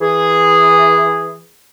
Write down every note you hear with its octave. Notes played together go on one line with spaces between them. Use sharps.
E3 G#4